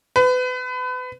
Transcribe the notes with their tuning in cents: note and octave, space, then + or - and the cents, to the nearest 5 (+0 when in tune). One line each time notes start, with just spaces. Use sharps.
B4 +30